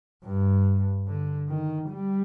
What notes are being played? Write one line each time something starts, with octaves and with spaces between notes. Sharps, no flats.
G2
D3
D#3
G3